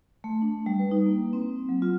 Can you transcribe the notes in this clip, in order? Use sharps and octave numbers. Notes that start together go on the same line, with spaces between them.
A3
D4
G3
B4
D#4
A#3
C4
F#3
F4